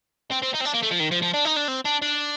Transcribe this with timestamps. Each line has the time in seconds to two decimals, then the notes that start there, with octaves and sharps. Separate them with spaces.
0.32 C4
0.43 C4
0.55 D#4
0.61 C4
0.66 D4
0.74 A#3
0.83 A3
0.91 F3
1.00 D#3
1.12 F3
1.23 F3
1.34 D4
1.45 D#4
1.57 D4
1.68 C4
1.85 D4
2.02 D4